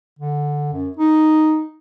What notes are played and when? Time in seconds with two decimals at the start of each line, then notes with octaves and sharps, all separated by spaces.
0.19 D3
0.73 F#2
0.97 D#4